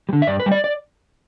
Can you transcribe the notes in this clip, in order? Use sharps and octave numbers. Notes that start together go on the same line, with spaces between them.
G3
D3
E5
G2 D5
B4
G3
D5
D5